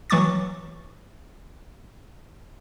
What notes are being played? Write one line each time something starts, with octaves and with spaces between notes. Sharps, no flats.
E3 F#3 C#6 D6 A6